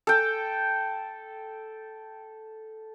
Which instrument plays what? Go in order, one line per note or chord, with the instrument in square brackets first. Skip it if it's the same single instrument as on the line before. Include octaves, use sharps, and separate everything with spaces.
[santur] A4 G5